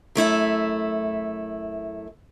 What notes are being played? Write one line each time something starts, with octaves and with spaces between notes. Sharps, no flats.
F#2 A3 E4 E5